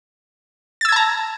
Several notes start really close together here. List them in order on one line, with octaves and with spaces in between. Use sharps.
A6 E6 G#6 A5 A#5